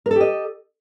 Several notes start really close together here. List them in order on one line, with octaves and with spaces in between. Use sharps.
A#4 A4 G4 D#5